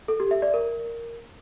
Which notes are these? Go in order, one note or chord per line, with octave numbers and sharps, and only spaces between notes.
A4
G4
E5
D5
A#4